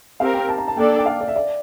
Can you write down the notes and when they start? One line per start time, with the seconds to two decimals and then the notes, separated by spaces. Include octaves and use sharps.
0.20 C4 G4 A#4 F5
0.34 G5
0.49 A5
0.58 A#5
0.68 A5
0.77 A#3 D4 A4 D5 G5
0.99 G5
1.06 F5
1.21 D5
1.28 E5
1.36 D5